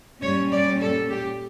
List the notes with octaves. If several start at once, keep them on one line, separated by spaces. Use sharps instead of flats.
A#2 G3 C#4 C#5
D5
A4
G4